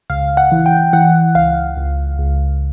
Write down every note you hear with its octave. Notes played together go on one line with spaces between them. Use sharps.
C#2 F5
F#5
E3
G5
E3 F#5
C#2 F5
C#2
C#2